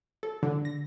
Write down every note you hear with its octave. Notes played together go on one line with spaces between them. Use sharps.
A4
D3
A#6